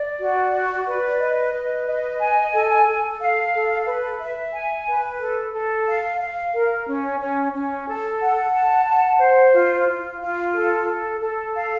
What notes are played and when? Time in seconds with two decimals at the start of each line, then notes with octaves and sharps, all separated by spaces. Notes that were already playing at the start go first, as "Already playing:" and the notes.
Already playing: D5
0.19 F#4
0.52 D5
0.86 B4
1.20 D#5
1.53 B4
1.87 D#5
2.20 G#5
2.53 A4
2.87 A4
3.20 F5
3.53 A4
3.86 B4
4.20 E5
4.53 G#5
4.87 B4
5.20 A4
5.53 A4
5.86 F5
6.21 F5
6.54 A#4
6.87 C#4
7.20 C#4
7.53 C#4
7.88 A4
8.21 F#5
8.54 A5
8.88 F#5
9.20 C5
9.54 F4
9.88 F4
10.20 F4
10.54 A4
10.88 A4
11.20 A4
11.55 F5